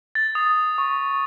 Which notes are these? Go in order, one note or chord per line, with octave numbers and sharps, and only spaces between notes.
A6
D#6
C#6